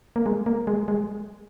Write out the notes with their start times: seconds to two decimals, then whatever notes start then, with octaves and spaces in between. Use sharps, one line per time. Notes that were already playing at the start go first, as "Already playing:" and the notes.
0.16 A#3
0.26 G#3
0.46 A#3
0.67 G#3
0.88 G#3